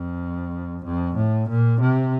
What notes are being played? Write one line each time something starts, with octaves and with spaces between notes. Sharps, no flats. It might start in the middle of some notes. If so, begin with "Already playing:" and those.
Already playing: F2
F2
A2
A#2
C3